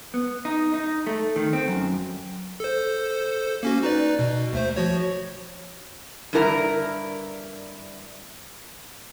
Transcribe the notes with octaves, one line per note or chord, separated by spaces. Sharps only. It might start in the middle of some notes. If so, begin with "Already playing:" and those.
B3
D#4
D#4
A3
D#3
C4
F#2
A4 C5
A#3 C#4 F#4
D#4 B4 D5
B2
D2 A3 C5
F3 F#4 C#5
G2 D3 E4 A#4 A5 A#5